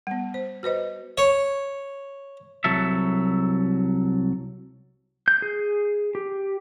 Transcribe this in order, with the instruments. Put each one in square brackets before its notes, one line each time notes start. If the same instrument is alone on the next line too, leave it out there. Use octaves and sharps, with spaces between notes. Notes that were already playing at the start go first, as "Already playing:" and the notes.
[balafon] G3 B3
C5
F#4 B4 C5 D#5
[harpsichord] C#5
[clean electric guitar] C2 F#3 A4 E5
[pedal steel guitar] G6
G#4
G4